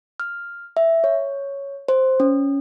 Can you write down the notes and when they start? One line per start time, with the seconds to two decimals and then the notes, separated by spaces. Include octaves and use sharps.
0.20 F6
0.77 E5
1.04 C#5
1.88 C5
2.20 C#4